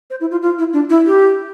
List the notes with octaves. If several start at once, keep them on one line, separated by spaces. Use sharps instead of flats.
C5
E4
F4
F4
E4
D4
E4
G4